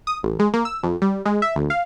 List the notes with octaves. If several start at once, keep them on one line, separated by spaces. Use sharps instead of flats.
D#6
A1
G#3
A#3
E6
F2
G3
G#3
E5
D2
F5